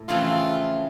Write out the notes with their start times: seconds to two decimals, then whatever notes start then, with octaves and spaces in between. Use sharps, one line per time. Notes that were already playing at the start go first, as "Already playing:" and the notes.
Already playing: A2
0.08 F2 C#3 E3 A3 C4 F4